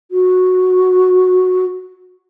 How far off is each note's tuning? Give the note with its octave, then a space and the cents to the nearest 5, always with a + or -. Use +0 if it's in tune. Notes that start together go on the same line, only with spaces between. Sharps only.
F#4 -10